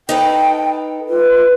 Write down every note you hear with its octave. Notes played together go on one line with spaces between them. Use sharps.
D#4 A4 B4 G5
F4 B4